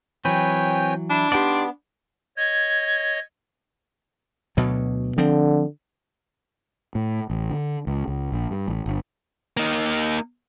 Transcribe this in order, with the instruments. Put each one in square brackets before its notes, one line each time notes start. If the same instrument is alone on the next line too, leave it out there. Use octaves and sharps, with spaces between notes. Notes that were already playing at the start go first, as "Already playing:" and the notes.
[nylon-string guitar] E3 F#3 [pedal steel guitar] C4 B4 [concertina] C#5 G5 G#5
[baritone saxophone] D4 [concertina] E4
[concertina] B3 [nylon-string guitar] D#4 G4 [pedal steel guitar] D5 G5 C6
[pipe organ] C#5 D#5 [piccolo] G#6
[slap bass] D2 B2 F#3
[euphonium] D3 [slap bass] F3 C4
[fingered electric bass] A2
A1
D3
C#2
C#2
A#1
G2
A1
G1
[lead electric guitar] A#3 D#4